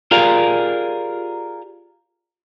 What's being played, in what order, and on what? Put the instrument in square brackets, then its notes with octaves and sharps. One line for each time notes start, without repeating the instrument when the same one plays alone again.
[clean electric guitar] F4 G4 G#4 A#4 D5 F5